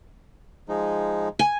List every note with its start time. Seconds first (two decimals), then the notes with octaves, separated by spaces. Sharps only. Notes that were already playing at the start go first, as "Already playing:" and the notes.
0.69 F3 G#3 D#4
1.39 G#5